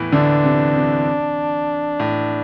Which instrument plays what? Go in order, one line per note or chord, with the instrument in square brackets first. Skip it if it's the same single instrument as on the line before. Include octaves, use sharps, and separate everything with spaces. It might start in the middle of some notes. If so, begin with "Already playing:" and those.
Already playing: [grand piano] E2 A2 E3
[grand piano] D2 D3 [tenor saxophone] D4
[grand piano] C3
C3
A2